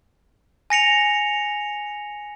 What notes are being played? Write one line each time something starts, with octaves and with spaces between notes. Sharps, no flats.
G#5 A#6 C#7 F7